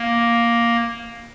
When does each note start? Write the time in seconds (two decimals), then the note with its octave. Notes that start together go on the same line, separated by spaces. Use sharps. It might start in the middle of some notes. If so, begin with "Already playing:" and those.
Already playing: A#3